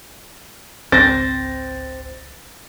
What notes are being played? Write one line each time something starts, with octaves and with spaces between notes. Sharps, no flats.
G#1 C#2 C4 A6 A#6